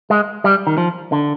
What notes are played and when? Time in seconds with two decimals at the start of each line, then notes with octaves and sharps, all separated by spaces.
0.10 G#3
0.44 G3
0.67 D#3
0.78 F3
1.12 D3